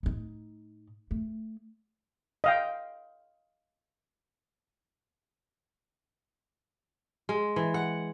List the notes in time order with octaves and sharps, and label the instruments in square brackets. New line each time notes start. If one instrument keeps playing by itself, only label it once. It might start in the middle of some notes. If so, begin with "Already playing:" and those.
[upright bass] A2 D#4
A3
[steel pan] D#5 F5 G5
[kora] G#3
E3
F#5